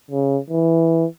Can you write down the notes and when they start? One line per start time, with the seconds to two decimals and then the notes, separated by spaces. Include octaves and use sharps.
0.11 C#3
0.50 E3